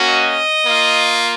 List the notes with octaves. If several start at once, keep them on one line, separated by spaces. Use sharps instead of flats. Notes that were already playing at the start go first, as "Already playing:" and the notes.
Already playing: A#3 C#4 F#4
D#5
A#3 F4